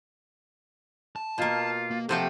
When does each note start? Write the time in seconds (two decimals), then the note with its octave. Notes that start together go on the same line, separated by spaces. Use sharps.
1.16 A5
1.38 B2 A#3 F4
1.91 A#3
2.09 C3 F3 G4 A4 E5 F#5